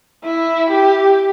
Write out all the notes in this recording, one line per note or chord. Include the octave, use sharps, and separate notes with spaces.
E4
G4